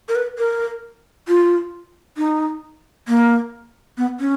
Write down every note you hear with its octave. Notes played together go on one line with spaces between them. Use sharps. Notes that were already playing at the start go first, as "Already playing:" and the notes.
A#4
B4
A#4
F4
D#4
A#3
B3
C#4